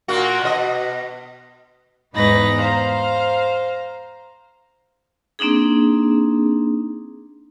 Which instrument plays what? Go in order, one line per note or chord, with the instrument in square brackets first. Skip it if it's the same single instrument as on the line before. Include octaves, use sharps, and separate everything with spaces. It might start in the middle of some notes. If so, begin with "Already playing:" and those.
[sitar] A#2 A#3 F#4
B2 D#5
[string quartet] E2 G#2 B3 D#4 B4 A#6
C5 F5 A#5
[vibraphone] A#3 C4 D4 D#4 G#4